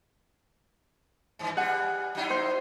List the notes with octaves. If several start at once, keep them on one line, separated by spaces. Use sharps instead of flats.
G2 E3
G3 G#4 F#5
F#3 D#4 E4
C5